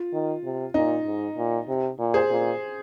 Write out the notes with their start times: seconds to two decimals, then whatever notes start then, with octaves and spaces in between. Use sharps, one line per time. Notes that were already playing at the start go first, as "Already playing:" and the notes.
Already playing: F4
0.13 D#3
0.44 C3
0.74 A#2 D#4
1.06 G#2
1.37 A#2
1.68 C3
1.99 A#2
2.14 G#4 C5
2.30 A#2